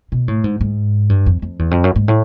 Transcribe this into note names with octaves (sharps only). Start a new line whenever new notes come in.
B2
A2
G#2
G#2
G2
F2
F2
E2
F2
F#2
G#2
A2